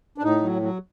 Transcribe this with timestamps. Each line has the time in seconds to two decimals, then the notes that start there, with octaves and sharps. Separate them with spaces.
0.18 D4
0.23 A2 D#4
0.43 F#3
0.62 F#3